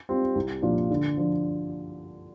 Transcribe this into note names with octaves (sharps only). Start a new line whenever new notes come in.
G3 C4 F4
C2
A#2 F3 D4 F4
D3
F3 D4